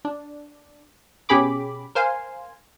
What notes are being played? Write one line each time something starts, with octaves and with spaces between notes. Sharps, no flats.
D4
B2 C#4 G4 G#4 B5 D6
A#4 C5 F5 G#5 C6